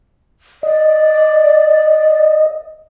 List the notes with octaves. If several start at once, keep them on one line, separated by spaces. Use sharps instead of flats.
D5 D#5